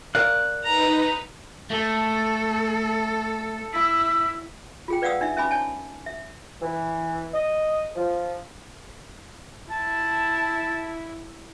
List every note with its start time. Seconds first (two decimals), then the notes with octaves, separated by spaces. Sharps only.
0.15 A#4 D5 F5 F#6
0.64 D#4 B4 A#5
1.70 A3 A4
3.73 E4 E6
4.88 F4 G#4 G5
5.02 B4 D5 F5 F#5 D#6 E6
5.21 D4 D#4 E5
5.37 C#4 E5 G#5 B5 D6
5.51 C#5 G#5 A5
6.06 E5
6.62 E3
7.34 D#5
7.96 F3
9.71 E4 A5